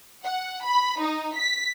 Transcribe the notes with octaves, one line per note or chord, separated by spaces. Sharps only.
F#5
B5
D#4
B6